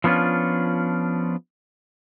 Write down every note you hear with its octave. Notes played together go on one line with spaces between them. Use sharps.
F3 B3 C#4 D4 F4